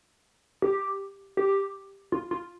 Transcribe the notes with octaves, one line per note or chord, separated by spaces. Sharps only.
G4
G4
F4
F4